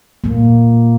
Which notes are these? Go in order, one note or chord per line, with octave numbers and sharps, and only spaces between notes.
A#2 A#3